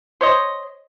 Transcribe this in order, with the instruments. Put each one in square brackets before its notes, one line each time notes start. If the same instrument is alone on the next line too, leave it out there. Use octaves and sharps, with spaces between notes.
[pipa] C5 C#5 D#5